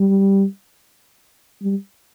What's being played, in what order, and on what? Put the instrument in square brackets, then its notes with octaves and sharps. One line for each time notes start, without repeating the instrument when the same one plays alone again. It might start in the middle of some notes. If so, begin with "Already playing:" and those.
Already playing: [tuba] G3
G3